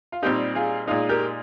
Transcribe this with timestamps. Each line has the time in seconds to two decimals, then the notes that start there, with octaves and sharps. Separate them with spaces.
0.12 F4
0.22 A#2 G3 C4 D#4 G4
0.55 F4 G#4
0.87 A#2 G#3 D#4 F4
1.09 G4 A#4